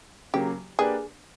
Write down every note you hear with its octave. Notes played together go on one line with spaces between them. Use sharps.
C#3 F#3 A#3 G4
A#3 D4 G4 G#4 B4 D5